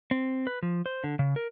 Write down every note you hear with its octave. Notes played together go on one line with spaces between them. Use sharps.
C4
B4
F3
C5
D3
C#3
A#4